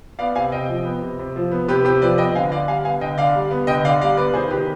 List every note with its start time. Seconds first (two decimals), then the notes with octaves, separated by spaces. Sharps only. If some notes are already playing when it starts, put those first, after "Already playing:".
0.19 B3 D5 F5
0.35 C3 F5 G#5
0.52 C3 D#5 G5
0.68 F3
0.85 B3
1.02 C3
1.19 C3
1.36 F3
1.51 B3
1.68 C3 G4 B4
1.85 C3 G4
2.02 F3 B4 D5
2.18 B3 D#5 G5
2.35 D3 F5 G#5
2.51 D3 D5 F5
2.68 G3 F5 G#5
2.84 B3 F5 G#5
3.01 D3 D#5 G5
3.18 D3 D5 F5
3.35 G3
3.51 B3
3.67 D3 D#5 G5
3.84 D3 D5 F5
4.01 G3 D5 F5
4.17 B3 B4 D5
4.34 D#3 G#4 C5
4.50 D#3 G4 B4